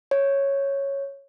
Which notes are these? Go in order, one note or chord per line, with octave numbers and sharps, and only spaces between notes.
C#5